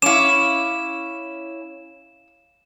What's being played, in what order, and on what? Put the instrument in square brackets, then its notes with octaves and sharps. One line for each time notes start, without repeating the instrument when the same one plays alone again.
[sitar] C#4 E4 [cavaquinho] F5 D6 [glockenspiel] E7